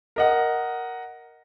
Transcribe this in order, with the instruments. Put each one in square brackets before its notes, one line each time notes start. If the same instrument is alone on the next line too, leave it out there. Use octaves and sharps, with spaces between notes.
[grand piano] A#4 D#5 F#5